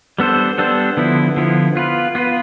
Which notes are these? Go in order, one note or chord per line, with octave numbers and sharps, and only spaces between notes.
G3 B3 D4 A4 C5
G3 B3 D4 A4 C5
D3 F3 B3 E4
D3 F3 B3 E4
B3 F4 B4
B3 F4 B4